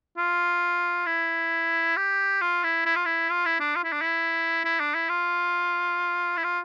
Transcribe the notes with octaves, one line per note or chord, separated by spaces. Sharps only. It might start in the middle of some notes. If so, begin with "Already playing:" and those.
F4
E4
G4
F4
E4
E4
F4
E4
F4
E4
D4
F4
E4
D4
E4
E4
D4
E4
F4
E4
F4